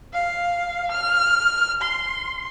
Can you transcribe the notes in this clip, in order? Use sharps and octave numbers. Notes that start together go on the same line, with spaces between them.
F5
F6
C6